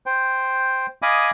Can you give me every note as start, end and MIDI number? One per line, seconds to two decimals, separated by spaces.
0.06 0.86 72
0.06 0.86 79
1.02 1.31 75
1.02 1.31 77
1.02 1.31 80
1.02 1.31 83
1.02 1.31 86
1.02 1.31 87